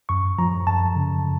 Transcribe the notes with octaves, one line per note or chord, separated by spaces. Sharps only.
F#2 C#6
F3 A#5
F#2 A5
C#3